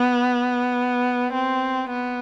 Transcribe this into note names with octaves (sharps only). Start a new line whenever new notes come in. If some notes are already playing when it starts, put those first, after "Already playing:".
Already playing: B3
C4
B3